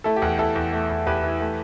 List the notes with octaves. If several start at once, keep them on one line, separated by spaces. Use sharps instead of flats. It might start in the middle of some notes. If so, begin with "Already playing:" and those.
A3 E4 A4
G4
E2
G4
E2 E4 A4
E2
A3
E2
E2 G4 B4
E3
A3